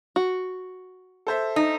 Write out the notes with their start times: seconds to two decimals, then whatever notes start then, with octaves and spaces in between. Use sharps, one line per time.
0.16 F#4
1.27 A4 C5 E5
1.56 D#4